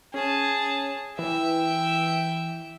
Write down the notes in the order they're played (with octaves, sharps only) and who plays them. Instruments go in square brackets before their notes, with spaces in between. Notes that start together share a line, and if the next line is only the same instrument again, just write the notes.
[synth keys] C#4 [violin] G#4 A5
[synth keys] E3 [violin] E5 G5